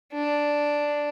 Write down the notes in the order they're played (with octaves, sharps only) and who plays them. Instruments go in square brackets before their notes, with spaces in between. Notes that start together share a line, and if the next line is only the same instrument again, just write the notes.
[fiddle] D4